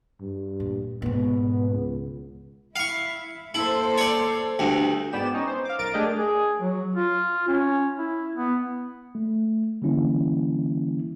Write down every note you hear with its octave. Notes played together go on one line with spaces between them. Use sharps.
G2
A#2
G#2 B2 B3
C#2
E4 F5 C#6
A#3 E4 A4 C5
C#5 D5
D2 G2
G#2 B3 D5 G5 E7
C#4 D#4
C5
F5 D6
B1 A#4 A6 D7
A3 D4 G4 G#4 A#4 D#5
G#4
F#3
F4
C#4
E4
B3
A3
D3 E3 G3 A#3 C#4 E4